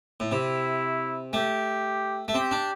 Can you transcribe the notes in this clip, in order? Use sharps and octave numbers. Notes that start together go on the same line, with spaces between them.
A2
C3 E4
A3 G4
A3
C4 G4
D4